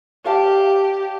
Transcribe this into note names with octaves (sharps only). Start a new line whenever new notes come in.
G4 D5 F5 A5